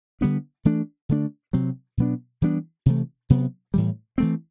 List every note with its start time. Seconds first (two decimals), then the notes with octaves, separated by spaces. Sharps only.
0.21 D3 G3 B3 D4
0.65 E3 A3 D4
1.09 D3 A3 D4
1.53 C3 F#3 C4
1.97 B2 F#3 B3 D4
2.42 E3 G3 B3 D4
2.86 C3 E3 A3
3.30 C3 F#3 B3
3.74 A2 E3 G3
4.18 E3 A3 C4